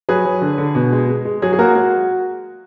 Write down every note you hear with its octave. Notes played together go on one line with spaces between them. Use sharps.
F#3 G#4 B4
F#3
D3
D3
B2
G#3
G#3
G#3
F#3 G#4
G#4
A#3 F#4 A#4
G#3 F#4